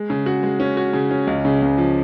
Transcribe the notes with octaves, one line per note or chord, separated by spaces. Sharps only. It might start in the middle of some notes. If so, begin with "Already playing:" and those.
Already playing: G#3
C#3
F#4
G#3
C#4
F#4
C#3
C#4
C#2
C#3
C#2
F3